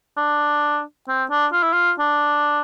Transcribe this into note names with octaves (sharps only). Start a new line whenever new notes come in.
D4
C4
D4
F4
E4
F4
D4